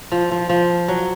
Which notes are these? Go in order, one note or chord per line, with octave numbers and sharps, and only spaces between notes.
F3
F3
F3
F#3